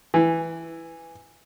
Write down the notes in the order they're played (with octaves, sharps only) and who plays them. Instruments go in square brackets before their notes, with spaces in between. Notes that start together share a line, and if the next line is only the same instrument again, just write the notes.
[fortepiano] E3